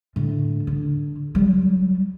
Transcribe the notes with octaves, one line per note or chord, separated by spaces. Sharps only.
A2 D3
D3
F#3 G3